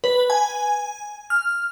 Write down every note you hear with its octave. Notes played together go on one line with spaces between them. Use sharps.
B4
G#5
F6